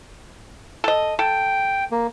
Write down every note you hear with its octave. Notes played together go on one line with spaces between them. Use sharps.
A4 D#5
A4 G5
A#3